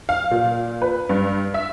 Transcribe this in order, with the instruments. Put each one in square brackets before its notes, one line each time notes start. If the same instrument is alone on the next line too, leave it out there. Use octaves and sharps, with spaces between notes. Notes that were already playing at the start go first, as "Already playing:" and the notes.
[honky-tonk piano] F5
A#2
B4
G2
E5